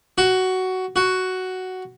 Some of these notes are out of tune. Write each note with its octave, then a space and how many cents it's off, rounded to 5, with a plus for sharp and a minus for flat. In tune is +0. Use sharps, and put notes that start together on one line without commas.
F#4 +10
F#4 +5